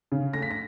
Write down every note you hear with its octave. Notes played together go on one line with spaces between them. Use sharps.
C#3
A3 A#6
B6
A#6